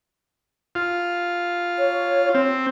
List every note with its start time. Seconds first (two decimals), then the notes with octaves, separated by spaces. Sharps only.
0.75 F4
1.79 C#5
2.35 C4